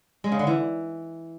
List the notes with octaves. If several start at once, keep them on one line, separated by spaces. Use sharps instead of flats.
G#3
C#3
D3
E3